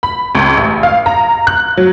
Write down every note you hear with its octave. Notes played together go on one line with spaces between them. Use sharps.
B5
C#2
A1
F5
A#5
F#6
F#3